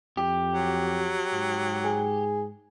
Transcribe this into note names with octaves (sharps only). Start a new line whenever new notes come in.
F2 G4
F#3
G#2
G#4